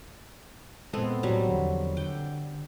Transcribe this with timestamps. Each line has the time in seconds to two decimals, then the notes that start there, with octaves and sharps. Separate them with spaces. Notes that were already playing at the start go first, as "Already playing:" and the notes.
0.93 A#2 G#3 B3 C4 A4
1.23 A2 F#3 G3
1.48 E2 D3 F3
1.97 D3 G5